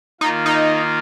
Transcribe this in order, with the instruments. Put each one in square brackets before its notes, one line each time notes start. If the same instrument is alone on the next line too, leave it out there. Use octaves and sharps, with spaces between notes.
[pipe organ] D#3 A#3 F4 [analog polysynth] D#4
[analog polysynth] D#4